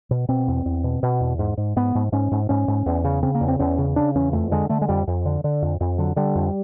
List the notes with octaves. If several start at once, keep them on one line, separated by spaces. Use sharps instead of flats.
B2
B2 C4
E2
E2
B2
B2
E2
G#2
G#2
G#2 B3
G#2
G#2 C#4
G#2
G#2 C#4
G#2
E2
C#3
C#3 C4
A#3
E2
C4
E2 C#4
C#3
C#3 D4
E2 C#4
F2 A3
D3 G#3
D3 A3
G#3
F2 G3
F2
D3
D3
F2
F2
D3 F#3
D3 G3
F2